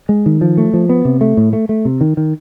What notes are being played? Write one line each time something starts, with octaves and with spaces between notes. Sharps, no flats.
G#3
D#3
F3
A3
F3
B3
C3
A3
A2
A3
A3
C3
D#3
D#3